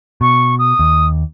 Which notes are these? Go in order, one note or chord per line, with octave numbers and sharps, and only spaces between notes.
B2 C#6
D#6
D#2